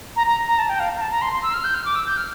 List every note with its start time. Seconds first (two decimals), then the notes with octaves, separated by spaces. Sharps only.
0.16 A#5
0.27 A#5
0.48 A#5
0.58 A5
0.69 G5
0.80 F5
0.97 A#5
1.01 A5
1.11 A#5
1.22 C6
1.32 C6
1.43 E6
1.53 F6
1.64 G6
1.75 F6
1.85 D6
1.96 E6
2.06 G6
2.17 F6